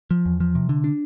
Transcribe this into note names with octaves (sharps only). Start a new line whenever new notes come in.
F3
E2
F3
C3
D3
D4